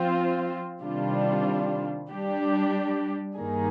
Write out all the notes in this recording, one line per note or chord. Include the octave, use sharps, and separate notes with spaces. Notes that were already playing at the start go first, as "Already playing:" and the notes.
Already playing: F3 C4 F4 C5
C3 D#3 G3 D4 F4
G3 D4 G4
G2 D#3 A#3 D#4 G#4